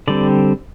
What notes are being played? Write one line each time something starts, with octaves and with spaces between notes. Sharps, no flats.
D3 G3 C4 D5